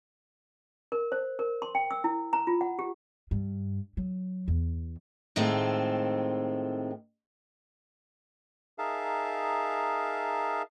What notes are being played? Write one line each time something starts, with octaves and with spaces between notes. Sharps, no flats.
A#4
C5
A#4
C6
G5
E6
E4
A#5
F4
F#5
G4
G2
F#3
E2
A2 D#3 G#3 A3 C4 F4
D#4 G#4 A#4 E5 F5 A5